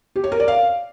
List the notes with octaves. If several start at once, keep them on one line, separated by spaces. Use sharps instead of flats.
G4
C#5
A#4
D5
F5